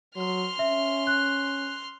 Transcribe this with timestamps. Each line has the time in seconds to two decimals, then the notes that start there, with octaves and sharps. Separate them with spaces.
0.16 F#3 C6 F6
0.59 C#4 E5
1.07 F#6